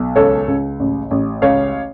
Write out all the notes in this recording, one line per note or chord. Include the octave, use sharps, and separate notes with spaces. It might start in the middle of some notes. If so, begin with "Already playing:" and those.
Already playing: B1
C#2 A4 C#5
C#2
A1
A1
C#2 C#5 F5